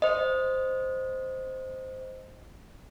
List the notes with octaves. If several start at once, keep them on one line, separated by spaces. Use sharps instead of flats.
C5 D#5